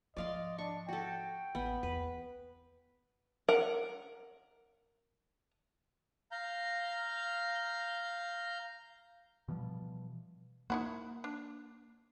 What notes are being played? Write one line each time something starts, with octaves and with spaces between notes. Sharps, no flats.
G#2 F3 D5 D#5 F5 C6
D4 C#6
F#4 A4 G5
A1 D#2 B3
E2 B4
A#4 F#5
F5 A#5 G6
B2 E3 F3 G3
A#3 D#4 E4 F#4
D4